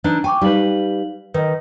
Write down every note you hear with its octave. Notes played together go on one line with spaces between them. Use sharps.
E3 D4 D#4
G5 G#5 C#6 D6
G3 D#4 B4 F5 F#7
D#3 B4 D#5